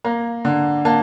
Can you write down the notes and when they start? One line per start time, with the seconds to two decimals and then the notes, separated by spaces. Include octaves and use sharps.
0.04 A#3 A#5
0.45 D3
0.85 A#3 A5